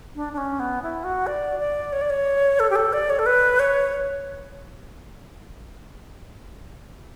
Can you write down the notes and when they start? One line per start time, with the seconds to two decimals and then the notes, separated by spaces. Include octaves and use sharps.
0.16 D4
0.33 D4
0.38 C#4
0.60 B3
0.83 E4
1.04 F#4
1.27 D5
1.60 D5
1.93 C#5
2.01 D5
2.10 C#5
2.60 A4
2.70 G4
2.76 A4
2.93 D5
3.10 C#5
3.19 A4
3.26 B4
3.59 C#5